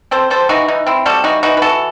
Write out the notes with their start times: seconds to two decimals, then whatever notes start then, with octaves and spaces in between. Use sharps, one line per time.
0.11 C4 A4 C5
0.30 G3 A4 C5
0.49 E3 D#4 F#4
0.68 E3 D#4
0.86 C4 E4
1.06 G3 F#4 A4
1.24 E3 D#4 F#4
1.43 E3 D#4 F#4
1.57 B4
1.62 E3 F#4 A4